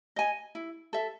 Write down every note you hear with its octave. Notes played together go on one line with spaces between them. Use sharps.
D#5 G#5
E4
A4 E5